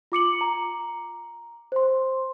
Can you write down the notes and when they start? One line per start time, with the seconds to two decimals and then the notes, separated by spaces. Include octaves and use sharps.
0.12 F4 D6 C#7 F#7
0.41 A#5
1.72 C5 C6